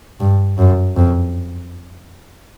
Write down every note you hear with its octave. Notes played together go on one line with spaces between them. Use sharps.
G2
F#2
F2